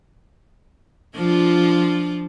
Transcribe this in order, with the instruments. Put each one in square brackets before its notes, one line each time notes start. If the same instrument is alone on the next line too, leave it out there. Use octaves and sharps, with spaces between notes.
[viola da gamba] F3 D4 F4